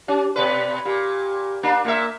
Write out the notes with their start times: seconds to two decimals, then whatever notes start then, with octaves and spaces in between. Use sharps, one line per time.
0.08 C#4 G4
0.36 B2 B4 D5
0.85 A#2 G4
1.63 A#3 D4
1.84 A#2 A#3 E5